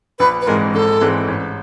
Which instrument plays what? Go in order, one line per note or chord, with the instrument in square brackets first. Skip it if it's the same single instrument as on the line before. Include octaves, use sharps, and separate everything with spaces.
[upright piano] A#1 [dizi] B4
[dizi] B4
[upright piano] G#2 E3 G#3 C4 [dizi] A#4
[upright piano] A#1 [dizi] A4
[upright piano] G#2 E3 G#3 C4
A1